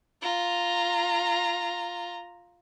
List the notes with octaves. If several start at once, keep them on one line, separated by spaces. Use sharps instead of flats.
F4 A#5